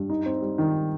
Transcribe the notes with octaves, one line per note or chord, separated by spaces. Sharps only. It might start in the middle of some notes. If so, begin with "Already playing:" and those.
Already playing: G2
D#4
C4
G3
D#3